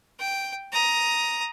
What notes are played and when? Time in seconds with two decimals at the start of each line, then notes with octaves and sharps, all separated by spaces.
0.19 G5
0.72 A#5 D#6